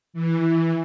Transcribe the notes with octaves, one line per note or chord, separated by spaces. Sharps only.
E3